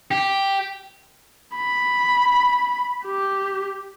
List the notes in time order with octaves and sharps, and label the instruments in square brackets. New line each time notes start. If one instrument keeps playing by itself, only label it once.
[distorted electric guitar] G4
[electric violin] B5
G4